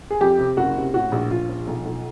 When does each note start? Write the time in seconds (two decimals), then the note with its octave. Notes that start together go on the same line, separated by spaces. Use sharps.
0.10 G#4
0.21 F2 G4
0.39 C3
0.57 F#1 F#4
0.76 C3
0.94 A2 F#4
1.12 A#1
1.30 A#1 F4
1.49 F3
1.67 B1
1.85 B1